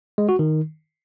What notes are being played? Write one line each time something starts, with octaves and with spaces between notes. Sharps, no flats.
G#3
F#4
D#3